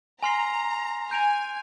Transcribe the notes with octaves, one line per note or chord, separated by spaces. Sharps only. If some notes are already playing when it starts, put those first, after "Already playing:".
G#5 A#5 C6 F6 C7 G7
G#5 G6 D7 F7